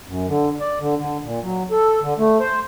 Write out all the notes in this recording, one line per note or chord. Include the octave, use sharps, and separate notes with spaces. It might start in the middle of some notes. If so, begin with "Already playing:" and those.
F#2
D3
D5
D3
D3
A#2
F#3
A4
D3
A3
C5